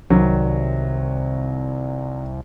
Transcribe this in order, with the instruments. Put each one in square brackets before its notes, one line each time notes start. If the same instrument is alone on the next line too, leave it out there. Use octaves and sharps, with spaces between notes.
[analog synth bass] C2 [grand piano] D#3 F#3